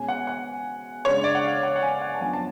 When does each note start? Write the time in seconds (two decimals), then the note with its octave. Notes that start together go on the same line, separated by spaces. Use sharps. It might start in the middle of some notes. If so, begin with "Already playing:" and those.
Already playing: B2 G#3 C#4 G#5
0.08 F#5
0.27 F#5
1.05 C#3 G#3 D4 C#5
1.24 D5
1.35 F#5
1.44 F5
1.63 F#5
1.76 F#5
1.83 G#5
2.02 F#5
2.14 A5
2.21 F#2 F3 B3 D4 G#5
2.33 A5